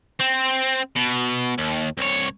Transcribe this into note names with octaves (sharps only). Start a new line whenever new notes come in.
C4
B2
D#2
C2 C#5